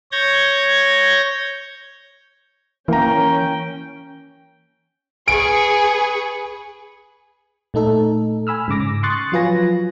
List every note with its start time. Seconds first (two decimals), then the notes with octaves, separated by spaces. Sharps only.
0.12 C#5 G6 G#6 A#6
2.88 E3 A#3 C#4 G5 A#5
5.28 G#4 B4 G#5 C#6 D7
7.74 A#2 A3 D#4 A4
8.47 G#5 B5 E6 F6
8.68 G#2 C#3 D6 A#6
9.03 C6 C#6 D#6 F#6 A6
9.32 F3 F#3 F4 B4 G#5 A#6